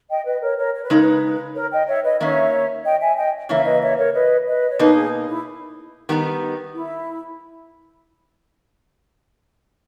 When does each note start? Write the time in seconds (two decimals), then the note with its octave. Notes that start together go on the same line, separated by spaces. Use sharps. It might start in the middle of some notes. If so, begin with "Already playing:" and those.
0.10 D#5 G5
0.25 B4 D#5
0.42 A#4 C#5
0.58 A#4 C#5
0.75 C#5
0.83 B4
0.90 C#3 G#3 D#4 A#4
1.01 B4
1.55 A#4 C#5
1.72 D#5 G5
1.87 C#5 E5
2.04 B4 D#5
2.20 D#3 A#3 C#4 C#5 E5
2.84 D#5 G5
3.01 E5 G#5
3.17 D#5 G5
3.49 C#3 E3 A#3 C#5 E5
3.66 B4 D#5
3.82 C#5 E5
3.97 A#4 C#5
4.14 B4 D#5
4.47 B4 D#5
4.69 C#5
4.79 B2 A#3 D#4 B4 D#5
4.95 G#4
5.28 E4
6.09 D#3 G3 B3 D#4
6.74 E4